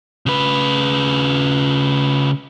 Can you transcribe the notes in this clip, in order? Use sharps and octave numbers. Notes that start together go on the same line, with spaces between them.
C#3 B4